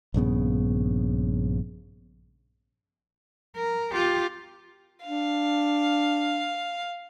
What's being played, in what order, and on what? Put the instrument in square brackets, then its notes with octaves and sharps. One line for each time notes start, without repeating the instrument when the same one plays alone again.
[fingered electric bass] A#1 G2 C#3 B3
[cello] A#4
F4 G4
[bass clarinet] D4 [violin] F5